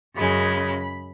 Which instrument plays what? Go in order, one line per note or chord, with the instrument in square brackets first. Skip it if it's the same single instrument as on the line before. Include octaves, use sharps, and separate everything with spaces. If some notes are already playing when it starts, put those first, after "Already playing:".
[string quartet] F#2 C#3 G#3 B5